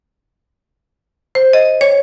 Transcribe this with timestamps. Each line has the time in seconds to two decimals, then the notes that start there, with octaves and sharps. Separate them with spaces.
1.35 C5
1.53 D#5
1.81 C#5